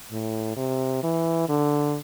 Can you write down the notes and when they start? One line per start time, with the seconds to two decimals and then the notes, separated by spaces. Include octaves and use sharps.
0.12 A2
0.57 C3
1.03 E3
1.49 D3